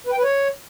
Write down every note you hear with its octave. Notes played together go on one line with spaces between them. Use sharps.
B4
G5
B4
C#5